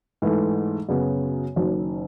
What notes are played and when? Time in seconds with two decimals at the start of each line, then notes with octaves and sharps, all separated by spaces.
0.22 G#2 E3 A3
0.89 F#2 C#3 F#3 B3
1.56 F#1 F#2 D#3